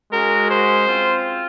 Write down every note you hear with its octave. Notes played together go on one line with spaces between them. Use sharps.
G#3 C#4 F#4 A#4
C5
C4 F4